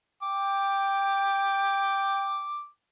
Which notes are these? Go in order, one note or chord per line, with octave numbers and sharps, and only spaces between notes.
G5 D6